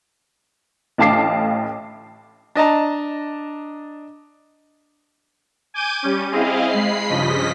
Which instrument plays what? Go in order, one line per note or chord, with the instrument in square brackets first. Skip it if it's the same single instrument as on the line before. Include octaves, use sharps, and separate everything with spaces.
[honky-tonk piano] A1 A2 F5 A5 D6 C7
[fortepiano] D4 D#5 A5 A#5
[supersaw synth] G#5 D6 G6 D#7
G3 C#4
C4 E4 G#4 D#5 F5
G#3 B5 C7
G2 C#3 F3 D#5 B6